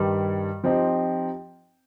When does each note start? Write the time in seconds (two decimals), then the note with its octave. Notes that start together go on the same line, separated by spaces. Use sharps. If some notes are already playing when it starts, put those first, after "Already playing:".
Already playing: G2 D#3 G3
0.64 F3 C4 D#4 G4